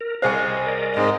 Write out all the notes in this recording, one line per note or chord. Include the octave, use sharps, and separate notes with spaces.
A#4
C2 G#4 C5 D#5 F5 G#5
A#4 D5 D#5
G#2 G#3 C4